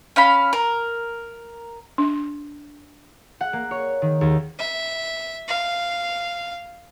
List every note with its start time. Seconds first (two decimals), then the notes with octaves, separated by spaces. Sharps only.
0.16 C#4 F5 B5
0.53 A#4
1.98 D4
3.41 F#5
3.53 A#3
3.71 C#5
4.02 D#3
4.21 D#2
4.59 E5
5.48 F5